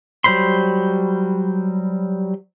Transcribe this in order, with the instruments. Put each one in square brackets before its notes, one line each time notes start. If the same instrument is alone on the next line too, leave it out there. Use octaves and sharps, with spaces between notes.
[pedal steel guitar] F#3 G3 C5 B5 C6